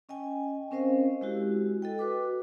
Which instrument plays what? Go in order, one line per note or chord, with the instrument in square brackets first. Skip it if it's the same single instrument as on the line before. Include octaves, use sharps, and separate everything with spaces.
[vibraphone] C#4 D#5 G5 G#5
C4 C#4 A#4 C5 D#5 F5
G#3 E4 F#4 G4
A4 D#5 G5
F#4 B4 D6